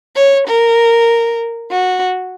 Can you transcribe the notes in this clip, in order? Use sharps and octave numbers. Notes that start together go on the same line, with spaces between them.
C#5
A#4
F#4